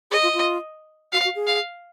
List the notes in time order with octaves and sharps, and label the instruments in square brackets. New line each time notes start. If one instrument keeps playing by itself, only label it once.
[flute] G#4 [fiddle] D#5
[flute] F4
F4
[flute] F#4 [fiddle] F5
[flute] F#4
G#4
[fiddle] F5